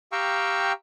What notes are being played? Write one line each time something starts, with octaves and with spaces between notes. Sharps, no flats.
G4 F5 G5 A#5 C#6 E6